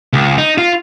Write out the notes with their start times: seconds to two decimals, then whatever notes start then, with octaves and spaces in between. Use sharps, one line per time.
0.13 C#2
0.38 D#4
0.58 F4